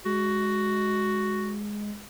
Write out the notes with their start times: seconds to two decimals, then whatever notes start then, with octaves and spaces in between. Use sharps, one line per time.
0.05 G#3 F#4